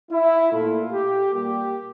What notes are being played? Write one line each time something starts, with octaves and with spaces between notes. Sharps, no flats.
E4
A#2 A3 F4
G4
A#2 G3 A#3 G4